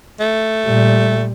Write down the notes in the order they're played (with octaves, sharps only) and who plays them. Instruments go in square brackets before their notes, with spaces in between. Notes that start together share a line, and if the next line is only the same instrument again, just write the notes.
[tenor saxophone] A3
[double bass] A#2 G3